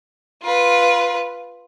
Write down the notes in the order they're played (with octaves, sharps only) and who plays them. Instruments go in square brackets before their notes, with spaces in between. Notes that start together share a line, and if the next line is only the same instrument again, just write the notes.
[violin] F4 B4